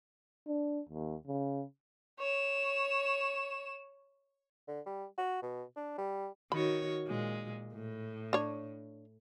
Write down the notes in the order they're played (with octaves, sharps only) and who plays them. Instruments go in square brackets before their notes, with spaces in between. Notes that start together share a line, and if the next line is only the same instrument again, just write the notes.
[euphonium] D4
D#2
C#3
[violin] C#5 E7
[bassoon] D3
G3
F#4
B2
D4
G3
[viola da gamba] D#3 F#4 C#5 [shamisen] B5
[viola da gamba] A#2 G#3
A2
[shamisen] D4 C#5